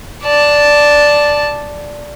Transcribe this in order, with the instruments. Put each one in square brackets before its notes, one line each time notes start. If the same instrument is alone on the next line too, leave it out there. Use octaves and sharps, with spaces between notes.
[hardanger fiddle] D5 A5